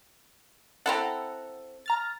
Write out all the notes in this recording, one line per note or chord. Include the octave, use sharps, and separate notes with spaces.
C4 E4 A4 F#5 A#5
A#5 F6 A6